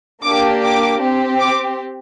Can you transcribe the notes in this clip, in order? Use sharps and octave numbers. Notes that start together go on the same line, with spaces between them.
A#3 D4 G4 D6
D6
C4 G4
D6